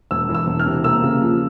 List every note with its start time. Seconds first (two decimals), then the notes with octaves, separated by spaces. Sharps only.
0.11 E1 E6
0.29 E3
0.34 E6
0.46 E1
0.59 F6
0.66 C3
0.84 A#3 E6
1.02 C#3
1.21 F3